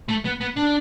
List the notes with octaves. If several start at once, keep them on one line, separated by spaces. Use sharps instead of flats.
A3
B3
B3
D4